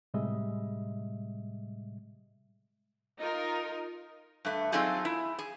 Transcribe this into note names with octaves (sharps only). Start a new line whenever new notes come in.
A2 C3 G3 G#3 D#5 E5
D#4 F4 A#4
G2 A3
F#3 C4 D#4 F4 G#4 A4
E4
G#4